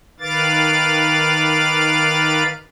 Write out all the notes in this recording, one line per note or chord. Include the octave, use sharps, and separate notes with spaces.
D#3 B4 F5 D6 A6